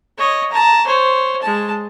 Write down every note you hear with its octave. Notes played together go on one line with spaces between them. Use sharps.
C#5 D#5
A5 A#5
C5 C#5
G#3 A5